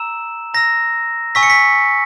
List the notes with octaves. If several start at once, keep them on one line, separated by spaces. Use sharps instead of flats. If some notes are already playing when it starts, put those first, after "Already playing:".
Already playing: A#5 E6 E7
A#5 E6 A#6
G#5 C#6 E6 B6
C#7
B6